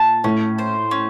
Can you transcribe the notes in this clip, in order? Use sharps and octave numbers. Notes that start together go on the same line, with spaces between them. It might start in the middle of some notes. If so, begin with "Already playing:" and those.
Already playing: A#2 A5
A2 C#4
C5
C#4